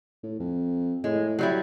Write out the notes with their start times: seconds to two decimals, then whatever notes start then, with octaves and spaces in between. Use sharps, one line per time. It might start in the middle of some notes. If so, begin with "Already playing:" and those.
0.23 A2
0.39 F2
1.04 A2 G#3
1.39 F#3 G3 E4